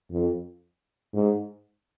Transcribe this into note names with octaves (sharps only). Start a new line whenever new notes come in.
F2
G#2